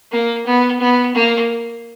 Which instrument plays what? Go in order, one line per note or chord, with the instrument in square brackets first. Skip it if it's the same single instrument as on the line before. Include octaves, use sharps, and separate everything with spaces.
[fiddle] A#3
B3
B3
A#3